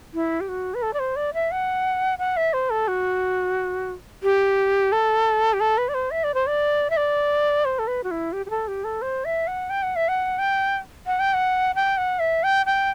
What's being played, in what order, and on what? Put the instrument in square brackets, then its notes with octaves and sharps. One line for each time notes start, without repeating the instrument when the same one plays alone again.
[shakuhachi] E4
G4
F#4
B4
A4
D5
C5
D5
E5
F#5
F#5
E5
C5
A4
F#4
G4
A4
G4
A4
B4
D5
C5
E5
D5
C5
D5
E5
D5
C5
A4
B4
F#4
E4
G4
G4
A4
G4
A4
C5
E5
F#5
G5
F#5
E5
F#5
G5
F#5
G5
F#5
G5
F#5
E5
G5
G5